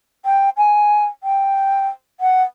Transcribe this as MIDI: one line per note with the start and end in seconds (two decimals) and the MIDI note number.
0.25 0.49 79
0.57 1.05 80
1.23 1.87 79
2.20 2.42 78